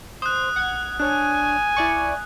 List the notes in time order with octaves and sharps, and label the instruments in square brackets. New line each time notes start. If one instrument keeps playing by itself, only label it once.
[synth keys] C5 [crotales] D#6 F#6
[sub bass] A#1 [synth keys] F#5 G#6
[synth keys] D4 C#5 [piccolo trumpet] G#5 [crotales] F#6
[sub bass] G#1
[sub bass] C2 [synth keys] E4 D5 C#6